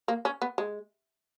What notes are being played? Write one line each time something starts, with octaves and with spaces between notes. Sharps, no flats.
A#3
C#4
B3
G#3